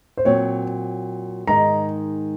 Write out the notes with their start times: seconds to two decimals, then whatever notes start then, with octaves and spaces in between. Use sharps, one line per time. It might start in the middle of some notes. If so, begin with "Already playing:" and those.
0.17 C5
0.25 A#2 F#3 C4 C#5
1.47 G#2 D#3 G#3 D#4 A#5